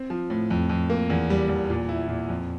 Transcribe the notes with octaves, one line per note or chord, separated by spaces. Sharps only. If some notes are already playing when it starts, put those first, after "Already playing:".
Already playing: C4
F3
A2
F2
F2
A#3
E2
G3
E2
A#2
E4
A#2
F2